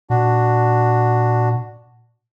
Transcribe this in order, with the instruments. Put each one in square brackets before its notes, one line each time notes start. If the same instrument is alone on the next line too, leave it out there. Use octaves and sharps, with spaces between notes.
[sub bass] A#2 [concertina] D4 F#4